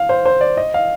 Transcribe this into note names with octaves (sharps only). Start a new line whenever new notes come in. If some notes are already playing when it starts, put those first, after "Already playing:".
Already playing: F5
C5
C5
D5
D#5
F5